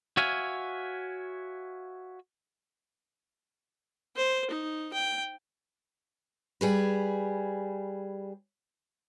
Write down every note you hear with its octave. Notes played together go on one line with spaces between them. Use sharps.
F#4 C#5 E5 F5 G#5
C5
D#4
G5
G3 G#4 B4